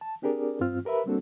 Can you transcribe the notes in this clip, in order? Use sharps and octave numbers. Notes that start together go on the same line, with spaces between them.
A5
C4 D4 G4 G#4 A#4 D5
G2 C4 F4 F6
G4 A#4 B4 E5 B5
G3 A#3 C4 D4 F#4 A4